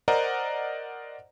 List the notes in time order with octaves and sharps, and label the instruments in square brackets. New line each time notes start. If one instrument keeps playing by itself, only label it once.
[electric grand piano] A#4 C5 D5 D#5 F#5 A#5